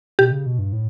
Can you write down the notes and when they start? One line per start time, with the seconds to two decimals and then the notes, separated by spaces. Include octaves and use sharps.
0.19 B2 G4
0.32 C#3
0.46 B2
0.59 G2
0.73 A2